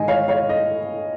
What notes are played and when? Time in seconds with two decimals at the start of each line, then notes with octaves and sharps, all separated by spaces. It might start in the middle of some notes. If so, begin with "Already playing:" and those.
Already playing: G#2 D#3 D#5 G#5
0.08 C#5 F5
0.28 C#5 F5
0.49 D#5